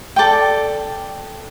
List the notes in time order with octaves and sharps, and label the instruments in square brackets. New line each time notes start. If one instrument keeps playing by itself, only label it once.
[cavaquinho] A4 D5 G5